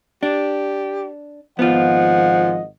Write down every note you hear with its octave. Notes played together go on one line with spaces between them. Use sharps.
D4 G4
G#1 F3 B3 F4 D#5 F#5